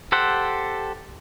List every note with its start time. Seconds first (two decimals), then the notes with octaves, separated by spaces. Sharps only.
0.12 G4 A4 C5 F#5